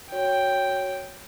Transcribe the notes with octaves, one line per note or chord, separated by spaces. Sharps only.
F#4 C#5 G5